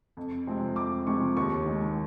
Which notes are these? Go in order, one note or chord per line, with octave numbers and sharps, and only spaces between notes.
F2
C3 F3 G#3 C4
F2 D6
C3 F3 G#3 C4 C#6
D#2 C#6
D#3 G#3